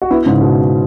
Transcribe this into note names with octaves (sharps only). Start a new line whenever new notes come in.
F#4
B3 E4
G#2 C#3
B2